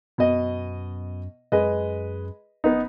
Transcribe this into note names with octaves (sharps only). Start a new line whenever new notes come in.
F#2 B2 D#5
F#2 G#3 B4 D#5
E1 B3 D#4